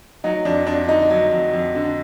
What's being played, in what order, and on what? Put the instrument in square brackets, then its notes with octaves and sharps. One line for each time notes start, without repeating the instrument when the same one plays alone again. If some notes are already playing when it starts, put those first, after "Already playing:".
[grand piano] F#3 D#4
F2 D4
F2 D4
D3 D#4
F#3
F2
F2
D3